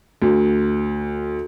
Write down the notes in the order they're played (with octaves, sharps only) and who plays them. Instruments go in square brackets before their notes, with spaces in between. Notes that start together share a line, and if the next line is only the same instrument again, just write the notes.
[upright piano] D2